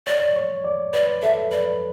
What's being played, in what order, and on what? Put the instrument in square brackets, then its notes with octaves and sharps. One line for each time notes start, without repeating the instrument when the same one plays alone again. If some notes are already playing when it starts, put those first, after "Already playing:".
[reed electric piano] C#5 [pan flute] D5
[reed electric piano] C#5
D5
[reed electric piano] B4 [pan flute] D5
[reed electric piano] A4 [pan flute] E5
[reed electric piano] B4 [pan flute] D5